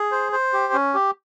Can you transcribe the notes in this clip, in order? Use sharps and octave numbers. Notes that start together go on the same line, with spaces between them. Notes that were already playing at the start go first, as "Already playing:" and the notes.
Already playing: G#4
C5
C5
G4
C#4
G4